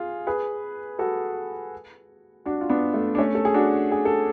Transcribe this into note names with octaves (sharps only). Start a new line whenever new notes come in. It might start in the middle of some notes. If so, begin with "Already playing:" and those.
Already playing: F4 G#4
G#4 B4
F#4 A4
D4 F#4
F4
B3 D4
A3
D4
A3 C#4
A4
G#4
D4 F#4
G#4
A4